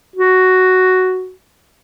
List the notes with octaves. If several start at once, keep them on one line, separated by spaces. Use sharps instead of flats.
F#4